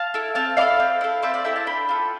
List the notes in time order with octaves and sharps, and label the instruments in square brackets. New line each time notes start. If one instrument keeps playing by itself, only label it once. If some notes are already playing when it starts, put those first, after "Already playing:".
Already playing: [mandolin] F5 A5
E4 A4
C4 F5 A5
E4 A4 D5 F5
C4
E4 A4
C4 C5 E5
D5 F5
E4 A4 E5 G5
F5 A5
D4 G5 B5
F4 A4